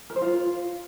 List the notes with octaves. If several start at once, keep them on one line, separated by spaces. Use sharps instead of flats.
A#4
C5
F4